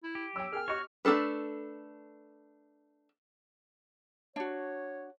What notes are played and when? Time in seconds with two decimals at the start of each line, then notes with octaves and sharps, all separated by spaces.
0.03 E4
0.15 G4
0.36 F#3 G5 E6
0.52 G#4 A#4 G5 F6
0.68 F#4 G4 C#5 D#5 C#6
1.05 A3 C4 D4 A4 B4
4.36 D4 F#4 C#5